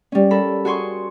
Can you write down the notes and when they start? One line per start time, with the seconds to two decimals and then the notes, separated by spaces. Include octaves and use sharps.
0.12 G3 C#4
0.31 A4 A#4 B5
0.65 F#4 G#4 G#5 C6 C#6